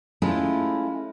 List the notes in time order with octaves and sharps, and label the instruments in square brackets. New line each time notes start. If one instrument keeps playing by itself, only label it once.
[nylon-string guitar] G#3 A3 C#4 E4 F4 G#4